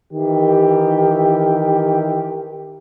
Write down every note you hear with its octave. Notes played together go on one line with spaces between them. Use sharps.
D#3 E3 G4